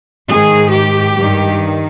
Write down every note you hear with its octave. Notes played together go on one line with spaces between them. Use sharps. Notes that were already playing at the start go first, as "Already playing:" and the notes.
G#2 D#3 G#4
G4
G2 D#3